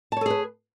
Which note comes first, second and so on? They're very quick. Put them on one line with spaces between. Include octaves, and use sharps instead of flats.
A5 C#5 A4 G#4 B4